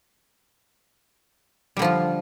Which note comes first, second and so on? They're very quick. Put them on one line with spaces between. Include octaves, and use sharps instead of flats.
G3 D3 F3 F4